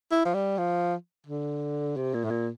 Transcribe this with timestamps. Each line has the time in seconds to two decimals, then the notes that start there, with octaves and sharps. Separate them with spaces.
0.11 E4
0.25 F3
0.34 G3
0.58 F3
1.27 D3
1.96 C3
2.14 A#2
2.24 A2
2.31 A#2